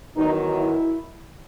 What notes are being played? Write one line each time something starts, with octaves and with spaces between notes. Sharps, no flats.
E2 D#3 F#3 D#4
E4